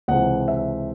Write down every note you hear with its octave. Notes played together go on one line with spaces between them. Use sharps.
C#2 C3 E3 F#5
E5